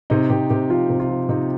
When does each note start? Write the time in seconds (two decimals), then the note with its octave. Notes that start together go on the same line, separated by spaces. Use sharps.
0.10 C3 D#4
0.30 C3 G4
0.50 C3 G4
0.69 F3 F4
0.90 C3
1.00 F4
1.09 F3
1.29 C3 D#4